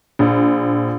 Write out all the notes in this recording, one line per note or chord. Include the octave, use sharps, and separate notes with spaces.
A#1